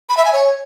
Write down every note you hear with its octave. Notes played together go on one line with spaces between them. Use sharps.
B5
E5
G#5
C#5